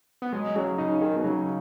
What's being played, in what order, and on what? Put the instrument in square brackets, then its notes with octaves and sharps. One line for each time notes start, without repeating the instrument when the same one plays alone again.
[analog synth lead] B3
[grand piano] F#3 [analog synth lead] G#3
[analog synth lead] C#3 [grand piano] F#3
[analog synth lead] C#3 [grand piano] D#4
[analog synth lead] D#3 [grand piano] G#4
[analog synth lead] B2
[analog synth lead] C#3 [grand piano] F#3